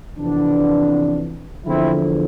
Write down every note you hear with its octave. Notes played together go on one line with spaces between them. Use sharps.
F2 C3 E3 B3 D4
E2 D3 F3 C4 E4